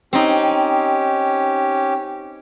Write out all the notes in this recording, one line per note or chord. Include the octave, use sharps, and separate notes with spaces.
C4 C#4 D#4 G4